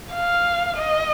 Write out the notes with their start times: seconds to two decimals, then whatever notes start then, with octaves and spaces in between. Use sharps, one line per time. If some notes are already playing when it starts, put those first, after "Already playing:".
0.13 F5
0.76 D#5